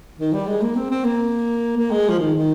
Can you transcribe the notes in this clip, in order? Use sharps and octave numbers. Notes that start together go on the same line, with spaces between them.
D#3
G3
G#3
A#3
C4
C4
A#3
A#3
G#3
F3
D#3
D#3